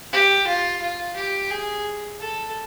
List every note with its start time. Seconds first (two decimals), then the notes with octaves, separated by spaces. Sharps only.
0.13 G4
0.48 F4
0.81 F4
1.17 G4
1.51 G#4
2.20 A4